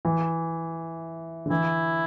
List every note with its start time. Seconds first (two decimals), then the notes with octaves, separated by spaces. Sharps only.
0.05 E3
1.46 D3
1.50 E3 E4